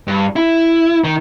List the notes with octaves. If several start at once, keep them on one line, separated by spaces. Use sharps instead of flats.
G2
E4
D#3